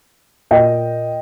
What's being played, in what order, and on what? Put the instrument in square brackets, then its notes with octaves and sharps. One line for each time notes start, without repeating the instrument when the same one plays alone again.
[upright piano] A#2 D#5 G5